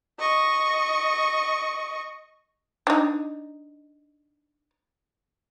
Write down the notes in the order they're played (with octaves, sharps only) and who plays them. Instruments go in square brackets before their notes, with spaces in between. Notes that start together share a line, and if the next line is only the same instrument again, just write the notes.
[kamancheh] D#5 C#6
[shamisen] D4 D#4